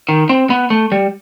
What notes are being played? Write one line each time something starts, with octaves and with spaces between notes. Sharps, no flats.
D#3
C4
B3
A3
G3